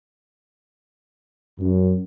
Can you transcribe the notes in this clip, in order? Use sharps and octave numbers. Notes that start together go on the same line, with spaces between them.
F#2